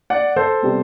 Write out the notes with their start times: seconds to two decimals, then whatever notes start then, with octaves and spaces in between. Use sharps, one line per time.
0.10 D5 F#5
0.36 A4 C5
0.62 C3 G3 B3